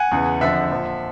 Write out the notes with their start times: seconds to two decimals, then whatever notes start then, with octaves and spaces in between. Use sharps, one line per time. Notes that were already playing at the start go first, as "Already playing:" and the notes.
Already playing: F#5 G#5
0.11 E2 C#3 E3
0.41 F2 D3 F3 E5 F#5
0.71 A#2 F3